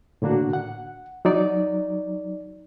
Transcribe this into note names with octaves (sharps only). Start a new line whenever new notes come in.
A2 D3 A#3 D4 F#4
F#5
F#3 D#4 D5